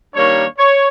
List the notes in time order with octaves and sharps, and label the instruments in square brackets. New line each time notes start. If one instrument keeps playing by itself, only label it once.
[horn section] D#3 G3 A#3 D4 C#5
C#5